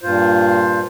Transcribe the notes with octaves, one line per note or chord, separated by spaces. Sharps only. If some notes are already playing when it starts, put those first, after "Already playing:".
G2 A#2 F4 C5